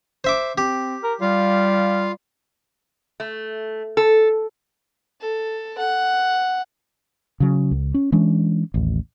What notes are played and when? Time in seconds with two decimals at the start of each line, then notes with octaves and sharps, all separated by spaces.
0.24 C5 E5 D6
0.58 C4 G4
1.03 A#4
1.21 G3 F4 F5
3.20 A3
3.97 A4
5.21 A4
5.78 F#5
7.40 C#3 F#3
7.71 C#2
7.94 C#4
8.12 E3 G#3 C#4 D4
8.74 A1 D#2